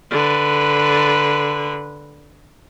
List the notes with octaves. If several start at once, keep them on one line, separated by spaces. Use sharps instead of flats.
D3 B4